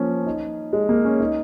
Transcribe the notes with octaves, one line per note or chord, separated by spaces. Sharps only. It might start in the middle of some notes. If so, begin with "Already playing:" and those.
Already playing: F3 A#3 C#4
D#4
G#3
A#3
C#4
D#4